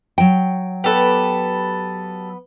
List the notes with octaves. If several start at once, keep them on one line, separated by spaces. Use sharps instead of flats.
F#3 G5
B3 G4 A4 B4